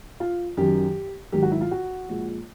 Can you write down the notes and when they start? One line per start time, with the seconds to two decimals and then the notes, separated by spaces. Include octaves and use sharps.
0.20 F4
0.57 F#2 D#3 F#3 G4
1.32 G#2 D#3 F#3 G4
1.43 F#4
1.52 E4
1.61 F4
1.71 F#4
2.09 A#2 F3 G#3